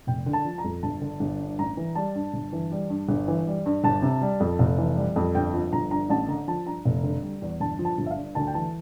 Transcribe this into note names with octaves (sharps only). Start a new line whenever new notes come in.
F1 G5
D3
A5
F3
A#5
F2
G1 A5
D3
G1
G2
A1 A#5
E3
G3 A5
G2
G1
E3
G3
G2
G1
E3
G3
G2
G1 A5
C3
G3
F2
F1
E3
G3
F2
G1 G5
F3
G1 A#5
G2 A#5
A1 A5
D3 A#5
F3 A5
G2 A#5
F1
D3
G3
E2
G1 A5
F3
A5
G1
E5
F5
G2
D2 A5
G5
E3 A5